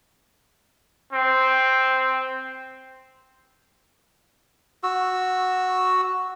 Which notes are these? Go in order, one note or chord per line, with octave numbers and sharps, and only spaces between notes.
C4
F#4 E6